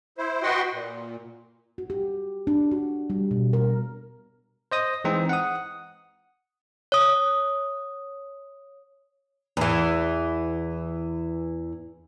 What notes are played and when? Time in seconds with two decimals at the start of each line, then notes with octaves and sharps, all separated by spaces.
0.18 E4 C5
0.43 F#4 B4 D#5 F#5 G5 C6
0.72 A#2
1.78 F#4
1.90 G4
2.47 D4
2.71 F#4
3.10 G3
3.31 B2
3.53 A#4
4.72 C5 D#5 D#6
5.04 E3 G#3 C4 D#4
5.29 F#5 D#6
6.92 C#5 D#6
9.57 E2 E3